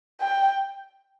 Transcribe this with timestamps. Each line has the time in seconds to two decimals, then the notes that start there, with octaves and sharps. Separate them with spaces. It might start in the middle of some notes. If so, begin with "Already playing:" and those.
0.21 G5